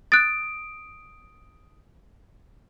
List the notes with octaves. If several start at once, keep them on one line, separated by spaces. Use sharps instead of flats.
D#6 F#6 A6 D7